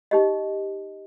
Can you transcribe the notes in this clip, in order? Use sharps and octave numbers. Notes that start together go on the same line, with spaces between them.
D#4 G4 D#5